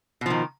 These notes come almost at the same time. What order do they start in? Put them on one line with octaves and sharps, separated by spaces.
B2 F3 D#3